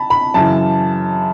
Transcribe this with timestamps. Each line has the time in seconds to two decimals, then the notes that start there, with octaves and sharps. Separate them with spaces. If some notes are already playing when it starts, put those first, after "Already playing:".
Already playing: A5 B5
0.10 B5
0.34 F#2 C#3 E3 A5